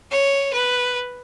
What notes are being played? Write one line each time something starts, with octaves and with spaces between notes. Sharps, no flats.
C#5
B4